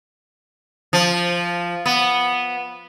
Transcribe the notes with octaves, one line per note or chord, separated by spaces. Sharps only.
F3
B3